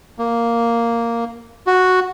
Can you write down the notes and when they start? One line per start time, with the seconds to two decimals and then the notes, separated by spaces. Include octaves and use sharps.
0.19 A#3
1.67 F#4